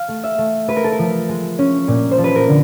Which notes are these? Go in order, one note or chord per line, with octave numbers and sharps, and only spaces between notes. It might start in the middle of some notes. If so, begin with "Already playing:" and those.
Already playing: F5
A3
E5
A3
G#3 B4
A#4
A4
A#4
F3
G#3
C#4
A#2
C5
F3
B4
A#4
D3